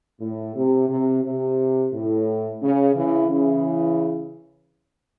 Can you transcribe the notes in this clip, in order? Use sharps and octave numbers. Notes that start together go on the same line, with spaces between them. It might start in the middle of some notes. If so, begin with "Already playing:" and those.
A2
C3
C3
C3
A2
C#3
C#3 E3
C#3 E3